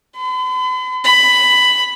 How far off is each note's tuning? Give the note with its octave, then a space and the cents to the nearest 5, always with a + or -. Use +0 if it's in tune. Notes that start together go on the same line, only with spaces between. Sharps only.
B5 +45
B5 +10